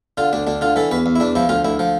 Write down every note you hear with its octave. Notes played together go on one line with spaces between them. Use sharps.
D3 F4
D2 D4
D2 D4
D3 F4
E3 A4
E2 B4
E2
E4
E2 D4
F3 E4
D2 F4
D2 E4
F3